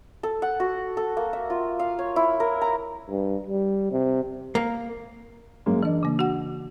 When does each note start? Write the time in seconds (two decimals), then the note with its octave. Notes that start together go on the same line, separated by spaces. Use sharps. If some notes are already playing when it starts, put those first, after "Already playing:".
0.23 A4
0.42 F#5
0.60 F#4
0.97 A4
1.17 A#3
1.33 E5
1.50 F4
1.79 F5
1.99 C#5
2.16 E4
2.40 A#4
2.61 A#5
3.09 G2
3.46 G3
3.92 C3
4.55 A#3
5.66 F#2 G#3 A#3
5.83 E3 D4 D#5
6.03 C#3 A#3
6.19 F#4 F#5